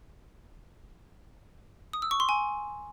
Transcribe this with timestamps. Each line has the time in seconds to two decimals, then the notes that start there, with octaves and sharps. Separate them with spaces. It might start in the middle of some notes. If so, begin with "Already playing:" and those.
1.93 D#6
2.02 E6
2.11 C#6
2.20 C6
2.29 G#5